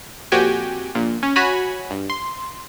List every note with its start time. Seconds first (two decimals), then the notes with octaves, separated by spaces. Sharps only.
0.32 F2 A#2 F#4 G4 G5 G#5
0.95 A#1 A#2
1.23 C#4
1.36 F#4 C#5 G#5 B5
1.91 G2
2.10 C6